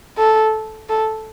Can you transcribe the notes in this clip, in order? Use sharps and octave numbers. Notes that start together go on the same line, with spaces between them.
A4
A4